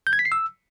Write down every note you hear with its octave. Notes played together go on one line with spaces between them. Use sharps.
G6
G#6
B6
C7
E6